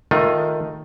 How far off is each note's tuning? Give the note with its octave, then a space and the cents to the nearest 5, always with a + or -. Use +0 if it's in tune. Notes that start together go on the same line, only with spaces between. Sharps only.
D#3 +0 A3 +10 F4 +20